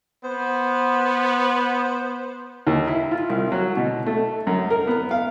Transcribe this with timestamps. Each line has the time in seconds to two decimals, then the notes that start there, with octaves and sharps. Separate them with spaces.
0.24 B3 C5
2.67 D#2
2.88 E4
3.11 F4
3.29 C2
3.52 F#3
3.77 B2
4.06 A3
4.47 F#2
4.70 A#4
4.87 B3
5.11 F5